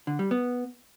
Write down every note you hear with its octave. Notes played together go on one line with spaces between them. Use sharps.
D3
G3
B3